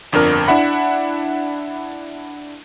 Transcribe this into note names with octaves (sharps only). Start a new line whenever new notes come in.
G1 F2 D4 A#4 F6
D4 E4 E5 F#5 B5